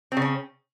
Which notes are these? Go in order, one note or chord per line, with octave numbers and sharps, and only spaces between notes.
C#3 C4 C#4